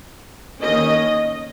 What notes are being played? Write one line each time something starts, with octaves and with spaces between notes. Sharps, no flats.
D#3 A#3 C#4 D#5